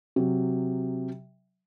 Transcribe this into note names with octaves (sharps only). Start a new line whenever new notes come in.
C3 F#3